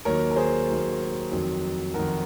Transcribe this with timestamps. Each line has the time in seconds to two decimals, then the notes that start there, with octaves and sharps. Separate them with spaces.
0.05 D#2 D#3 F#3 A#4 C#5
0.31 A#4
0.36 G#4 C5
0.68 D#2 D#3 F#3
1.31 F2 D#3 F#3
1.94 F2 D#3 F#3 F#4 A#4